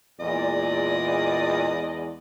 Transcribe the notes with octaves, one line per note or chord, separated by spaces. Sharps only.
E2 A#2 G#3 D5 D#5